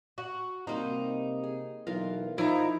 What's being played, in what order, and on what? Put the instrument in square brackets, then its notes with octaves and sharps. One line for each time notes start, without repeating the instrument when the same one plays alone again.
[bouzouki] F#4
[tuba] C3 [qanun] G3 A#3 C5 [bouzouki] D#4
[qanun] G#4
[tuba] B1 [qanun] E3 F4 A#4
[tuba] F3 [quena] D#4 [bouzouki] E4 A#5